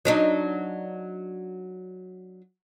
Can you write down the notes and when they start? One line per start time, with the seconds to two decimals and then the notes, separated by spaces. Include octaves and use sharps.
0.05 F#3 D4 D#4